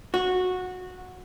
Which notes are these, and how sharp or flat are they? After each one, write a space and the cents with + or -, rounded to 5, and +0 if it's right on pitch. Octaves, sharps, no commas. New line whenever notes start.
F#4 -15